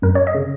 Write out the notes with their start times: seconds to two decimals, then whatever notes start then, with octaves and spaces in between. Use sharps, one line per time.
0.02 F#2 A#4
0.15 C#5
0.27 D#5
0.35 C#3